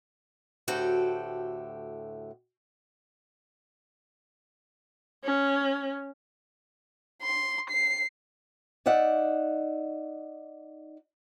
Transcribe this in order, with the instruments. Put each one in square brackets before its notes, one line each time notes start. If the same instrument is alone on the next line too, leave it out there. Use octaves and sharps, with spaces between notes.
[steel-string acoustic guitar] D2 A2 F#4 G4 A4 G5
[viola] C#4
[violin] C6
C7
[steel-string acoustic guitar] D#4 D5 E5 F#5